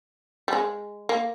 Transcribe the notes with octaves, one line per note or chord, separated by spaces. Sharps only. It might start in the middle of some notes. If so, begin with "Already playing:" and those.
G3
G#3
A#3